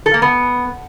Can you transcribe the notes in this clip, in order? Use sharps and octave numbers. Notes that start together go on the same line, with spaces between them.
A4
A#3
B3